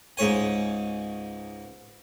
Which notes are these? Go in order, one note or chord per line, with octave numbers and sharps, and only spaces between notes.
C#2 G#2 C#5 G#5